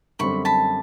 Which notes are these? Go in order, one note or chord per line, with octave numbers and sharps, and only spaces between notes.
F#2 D3 G3 C4 B5 C#6
A5 B5